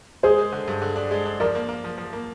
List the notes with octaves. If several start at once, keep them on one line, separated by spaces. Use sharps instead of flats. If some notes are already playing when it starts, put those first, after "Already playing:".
G#3 G#4 C5
G#3
D3
G2
D3
D4
G#3
D4
F3 A#4 D5
A#3
A#3
F3
F3
A#3